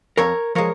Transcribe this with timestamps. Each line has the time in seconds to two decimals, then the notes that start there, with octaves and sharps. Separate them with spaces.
0.17 F2 A#4 C#5
0.55 F3 G#3 A#4 C#5